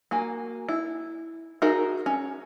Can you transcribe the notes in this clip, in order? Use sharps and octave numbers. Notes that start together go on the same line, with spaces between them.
A#3 F#4 G#5
E4
D#4 F#4 G#4 A#4 E5
C#4